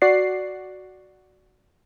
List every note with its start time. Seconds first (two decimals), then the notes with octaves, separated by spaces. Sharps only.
0.02 F#4 D5 C7